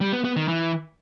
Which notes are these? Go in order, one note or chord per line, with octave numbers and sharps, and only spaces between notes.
G3
B3
B3
D#3
E3